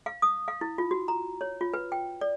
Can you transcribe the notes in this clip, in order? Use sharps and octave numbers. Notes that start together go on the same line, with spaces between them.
F5
D#6
F5
E4
F4
F#4
A#5
C#5
F4
B4
G5
D5